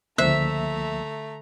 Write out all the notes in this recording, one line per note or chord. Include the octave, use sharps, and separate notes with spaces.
C#2 D3 F3 A3 A#3 C5 E5 A#5